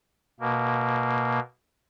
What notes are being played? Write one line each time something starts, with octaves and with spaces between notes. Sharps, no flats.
B2 A#3